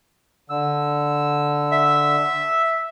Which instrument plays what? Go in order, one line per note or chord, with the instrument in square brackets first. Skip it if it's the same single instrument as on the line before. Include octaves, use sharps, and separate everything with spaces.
[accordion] D3 E6
[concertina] E5